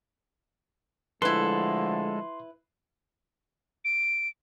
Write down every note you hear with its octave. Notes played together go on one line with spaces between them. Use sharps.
D3 F3 G#3 A3 E4 A4 B4 C6
D7